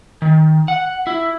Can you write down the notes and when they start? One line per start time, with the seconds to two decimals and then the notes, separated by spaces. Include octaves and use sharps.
0.22 D#3
0.68 F#5
1.07 E4